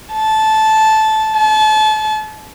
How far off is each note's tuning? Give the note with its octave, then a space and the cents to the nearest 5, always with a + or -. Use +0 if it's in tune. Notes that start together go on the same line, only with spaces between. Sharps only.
A5 -10
A5 -35